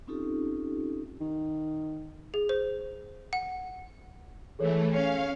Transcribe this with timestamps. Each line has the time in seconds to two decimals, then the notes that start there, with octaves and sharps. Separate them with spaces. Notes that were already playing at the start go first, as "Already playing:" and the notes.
0.07 C4 C#4 D#4 F4 G4 A4
1.20 D#3
2.34 G#4
2.49 C5
3.33 F#5
4.59 E3 A3 G#4 A4 C#5
4.92 C#4 F5